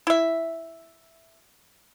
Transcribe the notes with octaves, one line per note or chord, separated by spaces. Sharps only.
E4 E5